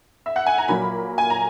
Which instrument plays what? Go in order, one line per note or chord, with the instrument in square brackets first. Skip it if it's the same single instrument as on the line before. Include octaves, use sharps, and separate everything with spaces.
[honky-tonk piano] E5
F#5
G#5
A#5
A#2 F#3 A#3 B5
G#5
A#5